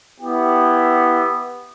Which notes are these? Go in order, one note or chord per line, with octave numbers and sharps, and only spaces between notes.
B3 E4 G4